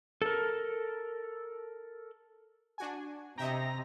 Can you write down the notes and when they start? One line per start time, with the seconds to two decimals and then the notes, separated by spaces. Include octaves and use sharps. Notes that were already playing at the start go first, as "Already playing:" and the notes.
0.22 A4 A#4
2.78 D4 F#4 G#5
3.38 C3 D#5 E5 G5 A#5